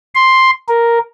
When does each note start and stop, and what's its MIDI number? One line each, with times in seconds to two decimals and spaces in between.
0.15 0.50 84
0.68 0.99 70